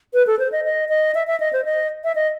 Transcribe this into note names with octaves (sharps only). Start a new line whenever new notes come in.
B4
A4
C5
D#5
D#5
D#5
E5
E5
D#5
C5
D#5
E5
D#5